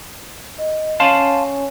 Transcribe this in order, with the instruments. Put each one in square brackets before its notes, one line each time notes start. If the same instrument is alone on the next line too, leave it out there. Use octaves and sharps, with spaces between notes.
[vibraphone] D#5
[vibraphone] C#4 C#5 G#5 [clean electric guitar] F5 A5 C6